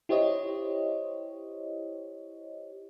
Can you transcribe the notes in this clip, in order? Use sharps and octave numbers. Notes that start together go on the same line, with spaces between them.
E4 G4 C5 C#5 D#5